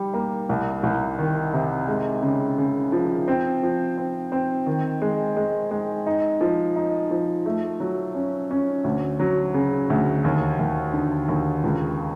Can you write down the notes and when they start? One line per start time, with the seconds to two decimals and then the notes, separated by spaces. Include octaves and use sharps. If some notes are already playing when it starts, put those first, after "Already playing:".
Already playing: G3
0.14 A#3
0.49 C2
0.83 C2
1.18 D#3
1.53 C3
1.88 G#3
2.23 C#3
2.58 C#3
2.92 F3
3.28 C4
3.63 F3
3.98 C4
4.32 C4
4.66 D#3
5.02 G#3
5.36 G#3
5.71 G#3
6.06 D#4
6.41 F3
6.76 D#4
7.11 F3
7.46 A3
7.80 F#3
8.15 C#4
8.51 C#4
8.84 D2
9.20 F#3
9.54 C#3
9.90 D2
10.24 D#2
10.59 D#2
10.93 D3
11.28 D#2
11.63 C#2